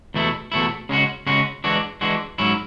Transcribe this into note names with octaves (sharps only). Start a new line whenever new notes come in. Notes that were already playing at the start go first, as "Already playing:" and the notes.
E2 B2 A3 E4
E2 B2 A3 E4
C#3 G#3 C#4 F#4
C#3 G#3 C#4 F#4
E3 G#3 D4 F#4
E3 G#3 D4 F#4
G#2 F#3 C#4 E4